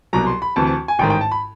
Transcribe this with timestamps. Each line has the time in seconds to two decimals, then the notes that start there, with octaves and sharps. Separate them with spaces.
0.13 C2 B2 F#3 A#5
0.27 C6
0.42 B5
0.56 D2 C3 E3 A5
0.67 A5
0.88 G#5
0.99 A1 G#2 D#3 G5
1.10 G5
1.21 A5
1.32 B5